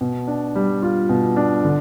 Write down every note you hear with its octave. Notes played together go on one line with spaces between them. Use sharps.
B2
D4
G3
F4
B2
D4
D3